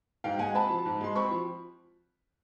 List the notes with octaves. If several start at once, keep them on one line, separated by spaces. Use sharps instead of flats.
G#2 F5 G5
G#3 F#5 G#5
C4 A5 B5
F3
G#2
G#3 C6
C4 B5 C#6
F3